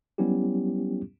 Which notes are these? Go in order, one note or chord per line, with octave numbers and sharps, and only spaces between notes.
F#3 G3 B3 C#4 E4 G4